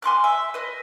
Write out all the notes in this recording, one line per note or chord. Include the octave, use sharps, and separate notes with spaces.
G#5 C6 D6 F#6
E5
B4 D#5